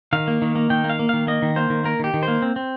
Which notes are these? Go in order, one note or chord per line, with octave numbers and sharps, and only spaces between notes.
D#3 F5
A#3
D#3
A#3
D#3 G5
A#3
F5
A#3
D#3 F5
A#3 D#5
D#3
A#3 C5
D#3
A#3 A#4
D#3 G4
D#3
C5
A#3
C4
C4